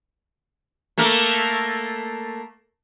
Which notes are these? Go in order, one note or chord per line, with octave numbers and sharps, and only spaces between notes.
A3 A#3 A#4